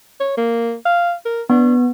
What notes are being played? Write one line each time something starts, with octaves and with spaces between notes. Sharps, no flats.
C#5
A#3
F5
A#4
B3 D4